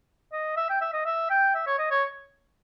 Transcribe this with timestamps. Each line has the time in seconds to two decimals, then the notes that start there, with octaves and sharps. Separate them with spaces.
0.32 D#5
0.57 E5
0.70 G5
0.81 E5
0.93 D#5
1.06 E5
1.30 G5
1.55 E5
1.67 C#5
1.79 D#5
1.91 C#5